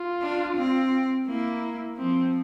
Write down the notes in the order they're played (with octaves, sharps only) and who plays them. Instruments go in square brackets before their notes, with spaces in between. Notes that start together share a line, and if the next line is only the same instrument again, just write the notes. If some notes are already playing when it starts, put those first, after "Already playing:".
Already playing: [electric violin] F4
[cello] D4
C4
[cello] A#3 [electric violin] E4
[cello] F3 [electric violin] C4